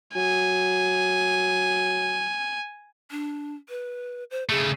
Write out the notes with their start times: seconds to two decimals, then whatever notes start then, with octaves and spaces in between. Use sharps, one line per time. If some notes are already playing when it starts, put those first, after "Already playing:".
0.16 F#3 G#5
3.11 D4
3.69 B4
4.31 C5
4.49 C#3 A3 G#4